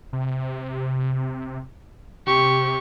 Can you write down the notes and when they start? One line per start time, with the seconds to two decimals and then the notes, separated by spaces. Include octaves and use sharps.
0.13 C3
2.27 C3 G4 C#6